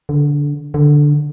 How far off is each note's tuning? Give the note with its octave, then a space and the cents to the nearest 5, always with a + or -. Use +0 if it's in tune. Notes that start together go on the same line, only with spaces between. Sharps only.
D3 -15
D3 +0